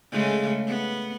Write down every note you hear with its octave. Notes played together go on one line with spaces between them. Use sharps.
C#3 G#3 A3
B3